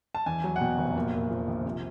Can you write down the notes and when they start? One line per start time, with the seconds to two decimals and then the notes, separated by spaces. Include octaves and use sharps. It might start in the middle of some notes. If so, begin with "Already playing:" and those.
0.15 A5
0.26 E2 G#5
0.44 F#3
0.56 F#5
0.61 B2 G5
0.78 F1
0.96 A#2
1.14 A#3
1.31 F3
1.47 A#1
1.65 C3